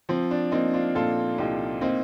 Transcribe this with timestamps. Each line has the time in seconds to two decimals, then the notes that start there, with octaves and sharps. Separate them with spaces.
0.09 F3 C4
0.31 D4
0.51 A#3 C4 D#4
0.74 D4 F4
0.95 A#2 F4 A4
1.38 C2 D#4 G4
1.81 A#3 C4 D#4